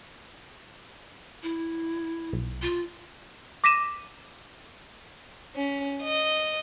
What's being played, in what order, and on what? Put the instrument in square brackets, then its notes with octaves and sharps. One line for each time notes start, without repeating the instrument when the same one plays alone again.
[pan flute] E4
[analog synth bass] B1
[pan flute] F4
[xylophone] D6 A#6 B6 D#7 E7
[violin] C#4
D#5